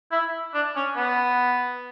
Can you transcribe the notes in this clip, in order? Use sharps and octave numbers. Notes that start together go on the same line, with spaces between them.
E4
D4
C#4
B3